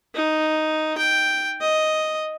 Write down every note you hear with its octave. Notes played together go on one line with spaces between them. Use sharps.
D#4
G5
D#5